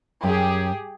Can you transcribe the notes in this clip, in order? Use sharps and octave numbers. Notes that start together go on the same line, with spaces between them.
F#2 G4 G#4